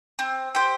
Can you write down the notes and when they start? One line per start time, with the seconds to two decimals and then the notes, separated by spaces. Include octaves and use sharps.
0.19 C4
0.55 G4 C5